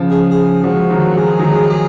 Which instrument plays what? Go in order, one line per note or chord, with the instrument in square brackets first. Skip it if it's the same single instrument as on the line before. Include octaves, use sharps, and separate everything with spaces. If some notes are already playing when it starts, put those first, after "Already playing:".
Already playing: [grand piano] C#3 F3
[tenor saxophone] G#4
G#4
[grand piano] F3 G#3 [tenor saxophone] F#4
[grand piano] D#3 F#3
[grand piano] F#3 [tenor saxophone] G#4
[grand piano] G#3
D#3 F#3
[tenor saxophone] G#4